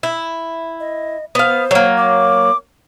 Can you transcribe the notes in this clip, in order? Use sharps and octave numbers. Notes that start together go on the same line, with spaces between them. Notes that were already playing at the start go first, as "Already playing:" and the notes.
E4
D#5
B3 C5 F5
F#3 A#3
D6